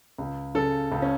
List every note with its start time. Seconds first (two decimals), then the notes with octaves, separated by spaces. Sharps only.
0.19 C#2
0.55 C#3 A4
0.92 C#2
1.02 C#4